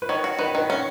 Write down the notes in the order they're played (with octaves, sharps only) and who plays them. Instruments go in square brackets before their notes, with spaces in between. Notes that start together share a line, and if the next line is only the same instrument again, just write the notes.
[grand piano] B4
[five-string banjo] D#3 [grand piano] C#5
[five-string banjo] F#4
[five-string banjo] D#3 [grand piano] B4
[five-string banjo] D#3 [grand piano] B4
[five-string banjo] C#4 [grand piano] C#5